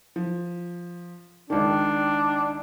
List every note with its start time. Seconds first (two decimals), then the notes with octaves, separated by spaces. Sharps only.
0.16 F3
1.50 C#2 D#3 D4